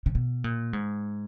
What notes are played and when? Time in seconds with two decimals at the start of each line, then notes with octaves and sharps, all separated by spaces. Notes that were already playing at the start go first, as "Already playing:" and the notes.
0.06 C#3
0.15 B2
0.44 A#2
0.73 G#2